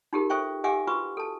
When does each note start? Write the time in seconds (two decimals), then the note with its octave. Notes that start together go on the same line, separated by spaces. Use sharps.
0.13 D#4 F4 G4 G#4 A#4
0.30 A4 C5 E5 G5 C#6
0.64 G4 E5 F#5 G#5 D6 E6
0.87 F4 F#4 B4 C#6 D#6 E6
1.17 A4 A5